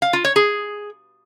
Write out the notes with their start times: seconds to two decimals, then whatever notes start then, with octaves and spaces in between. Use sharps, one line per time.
0.02 F5
0.13 F4
0.25 C#5
0.36 G#4